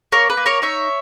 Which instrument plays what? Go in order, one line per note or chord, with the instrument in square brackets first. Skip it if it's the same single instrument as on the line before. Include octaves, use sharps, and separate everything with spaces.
[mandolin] A#3 A#4 C#5
B4
A#3
A#4 C#5
D#4 C#5 E5